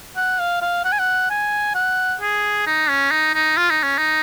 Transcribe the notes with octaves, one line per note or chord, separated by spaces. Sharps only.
F#5
F5
F5
F#5
G#5
F#5
G#5
F#5
G#4
D#4
C#4
D#4
D#4
F4
D#4
C#4
D#4